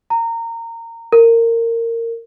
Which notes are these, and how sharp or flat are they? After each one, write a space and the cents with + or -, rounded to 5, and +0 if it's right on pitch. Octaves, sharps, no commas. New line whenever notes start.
A#5 -20
A#4 -20